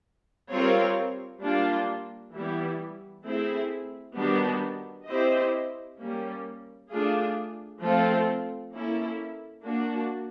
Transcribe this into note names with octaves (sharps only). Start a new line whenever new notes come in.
G3 C4 F4 A#4 C#5
G3 A#3 D4 F4
E3 G3 B3 E4
A3 C4 E4 G#4
D#3 G3 B3 D4 F#4
C4 E4 G4 C5 D#5
G3 A#3 C#4
A3 D4 F4 G#4
F3 A3 C4 F4 A4
A#3 C#4 E4 A4
A#3 D4 F#4